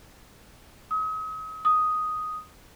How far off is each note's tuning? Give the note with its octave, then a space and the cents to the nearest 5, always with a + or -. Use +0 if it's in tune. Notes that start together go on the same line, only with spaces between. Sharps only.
D#6 +40
D#6 +5